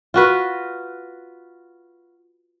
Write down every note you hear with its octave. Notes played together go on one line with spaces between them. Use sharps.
F4 F#4 B4